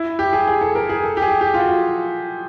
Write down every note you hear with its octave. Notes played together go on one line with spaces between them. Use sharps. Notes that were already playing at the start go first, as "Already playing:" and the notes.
Already playing: E4
G4
G#4
G#4
A4
A#4
G#4
A4
G4
G#4
G4
F4
F#4